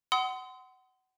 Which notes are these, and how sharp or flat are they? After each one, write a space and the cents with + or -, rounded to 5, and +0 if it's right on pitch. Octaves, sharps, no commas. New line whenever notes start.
F#5 +25 C6 -25 D#6 +35